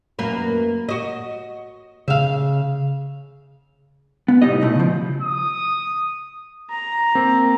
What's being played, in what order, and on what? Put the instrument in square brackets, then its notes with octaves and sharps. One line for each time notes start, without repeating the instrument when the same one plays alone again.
[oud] F#2 A#3 B4
F#4 D#5
[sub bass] C#3 [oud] E5 F5
[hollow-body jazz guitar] B3
C2 A2 D#4 G4 D#5
B2 A3 E4
C#3 F3
[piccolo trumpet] D#6
[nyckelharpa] A#5
[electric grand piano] A#3 C4